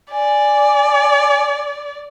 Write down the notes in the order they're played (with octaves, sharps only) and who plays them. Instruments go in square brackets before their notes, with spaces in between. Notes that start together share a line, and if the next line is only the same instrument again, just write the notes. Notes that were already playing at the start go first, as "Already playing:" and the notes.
[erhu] D5 [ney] G#5